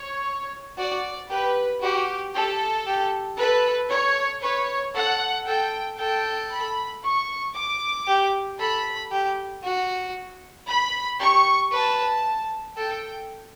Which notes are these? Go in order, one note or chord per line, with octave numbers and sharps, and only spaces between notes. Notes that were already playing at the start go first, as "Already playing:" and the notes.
Already playing: C#5
F#4 D5
G4 B4
F#4 G4
G4 A4
G4
A4 B4
C#5
B4 C#5
A4 F#5
A4 G5
A4 G5
B5
C#6
D6
G4
A4 B5
G4
F#4
B5
G4 C#6
B4 A5
A4 G5